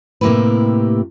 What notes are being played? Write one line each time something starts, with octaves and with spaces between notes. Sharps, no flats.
A2 C3 A#3 E4 G4 B4